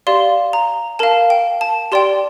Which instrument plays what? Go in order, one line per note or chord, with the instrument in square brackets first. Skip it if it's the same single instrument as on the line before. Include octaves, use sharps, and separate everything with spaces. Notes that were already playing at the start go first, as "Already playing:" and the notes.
[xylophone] G4 D5 F5 C6
A#5
A#4 F5 A5
G5
A5
G4 D5 G5 C6